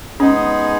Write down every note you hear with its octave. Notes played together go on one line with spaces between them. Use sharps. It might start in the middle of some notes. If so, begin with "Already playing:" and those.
G#3 B3 C#4 D#4 G#4